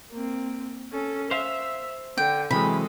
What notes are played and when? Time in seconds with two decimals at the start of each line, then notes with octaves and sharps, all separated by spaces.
0.12 A#3 C4
0.92 C#4 A4
1.31 C5 E5 F5
2.18 D3 G5
2.51 C3 E3 F#3 G#3 A4 B5